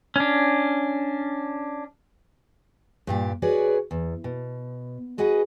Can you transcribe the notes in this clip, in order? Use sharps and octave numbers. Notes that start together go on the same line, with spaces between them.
C#4 D4
G2 A#2 G4
F#4 G#4 B4 C#5 D5
E2
B2
F#4 G#4 B4 D#5 F#5